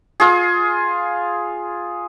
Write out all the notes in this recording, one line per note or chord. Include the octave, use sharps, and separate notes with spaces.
F4 G#4